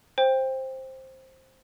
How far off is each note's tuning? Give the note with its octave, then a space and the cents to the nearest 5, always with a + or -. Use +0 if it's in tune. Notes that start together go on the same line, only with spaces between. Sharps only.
C5 +10 G5 +15